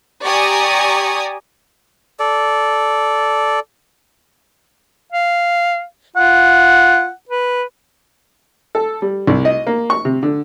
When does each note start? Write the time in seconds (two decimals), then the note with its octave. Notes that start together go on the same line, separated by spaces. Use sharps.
0.24 G4 D5 G#5 A#5 C#6 D#6
2.19 A4 D5
5.12 F5
6.16 F4 F#5
7.29 B4
8.75 A4
9.02 G3
9.27 C2
9.45 D#5
9.67 A#3
9.90 C#6
10.05 C3
10.23 D3